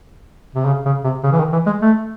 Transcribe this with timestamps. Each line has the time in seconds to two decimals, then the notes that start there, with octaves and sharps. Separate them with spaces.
0.55 C3
0.65 C#3
0.85 C#3
1.04 C3
1.23 C#3
1.32 E3
1.38 D#3
1.53 E3
1.66 G#3
1.82 A3